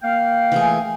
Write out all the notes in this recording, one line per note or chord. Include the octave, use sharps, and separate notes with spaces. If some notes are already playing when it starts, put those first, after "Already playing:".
A#3 F5 G5
E3 A3 G#4